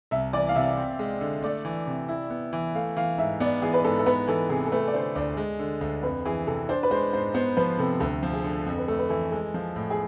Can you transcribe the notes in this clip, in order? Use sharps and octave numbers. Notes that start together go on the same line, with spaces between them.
C2 E5
E3 D5
F5
C3 E5
C4
G#3
D3
A3 D5
E3
C3
E4
B3
E3
A3 F5
E3 F5
G#2 E5
B3 D5
E3 G#4
B4
G#2 A4
A4
B3 B4
E3 A4
C3 G#4
A4
A3 B4
D5
D3 C5
D2 D5
G#3
D3
D2
F2 B4
E3 G#4
C3 A4
D4 C5
B4
G#3 C5
G#2 C5
B3 C5
F3 B4
C3 A4
D2 A4
F3
G#4
D3
F2 A4
B4
A3 A4
B4
E3 A4
G#3 A4
F3
A2
G#4